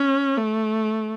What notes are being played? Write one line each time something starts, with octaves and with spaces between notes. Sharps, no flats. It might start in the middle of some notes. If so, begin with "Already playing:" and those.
Already playing: C#4
A3